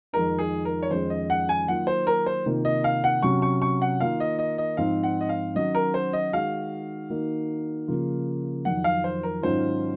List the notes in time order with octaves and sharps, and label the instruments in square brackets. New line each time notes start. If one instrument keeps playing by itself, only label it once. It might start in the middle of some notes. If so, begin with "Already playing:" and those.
[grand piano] F2 D#3 G#3 D#4 [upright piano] A#4
[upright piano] G#4
A#4
C#5
[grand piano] F2 D#3 G#3 C#4 F4 [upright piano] C5
[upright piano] D#5
F#5
G#5
[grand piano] D#3 F#3 A#3 F4 [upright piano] F#5
[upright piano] C5
A#4
C5
[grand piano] C3 D#3 A#3 F4
[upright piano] D#5
F5
F#5
[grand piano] C3 F#3 C#4 F#4 [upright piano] C#6
[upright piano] C#6
C#6
F#5
[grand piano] D#3 A#3 F4 [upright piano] F5
[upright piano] D#5
D#5
D#5
[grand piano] G#2 F3 C4 D#4 [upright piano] F5
[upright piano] F#5
D#5
F5
[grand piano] D#3 F#3 C#4 F#4 [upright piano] D#5
[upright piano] A#4
C5
D#5
[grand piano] D#3 G#3 D#4 F#4 [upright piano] F5
[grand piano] D#3 A#3 D#4 F#4
C#3 F3 A#3 F4
[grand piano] F2 D#3 F#3 [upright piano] F#5
[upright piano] F5
C5
A#4
[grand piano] G#2 D#3 F#3 C#4 F4 [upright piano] C5